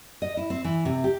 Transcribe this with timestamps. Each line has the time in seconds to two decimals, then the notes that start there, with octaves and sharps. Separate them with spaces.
0.22 D#5
0.37 E4
0.50 C4
0.64 E3
0.85 C3
1.04 G4